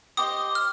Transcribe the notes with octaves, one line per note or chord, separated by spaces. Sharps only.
G4 C5 D#5 D#6
F6